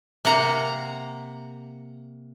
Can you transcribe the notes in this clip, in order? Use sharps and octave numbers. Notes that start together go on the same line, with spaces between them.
C3 A#3 F#5 A#5